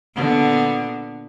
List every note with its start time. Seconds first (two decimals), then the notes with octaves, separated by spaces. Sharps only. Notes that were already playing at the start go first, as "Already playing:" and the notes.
0.15 A#2 D3 B3